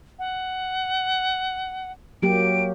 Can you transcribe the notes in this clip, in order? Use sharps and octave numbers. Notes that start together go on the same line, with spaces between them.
F#5
F#3 A#3 G4 D7